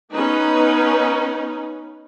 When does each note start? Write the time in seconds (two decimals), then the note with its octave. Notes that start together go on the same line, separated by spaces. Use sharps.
0.12 B3 C#4 D#4 B4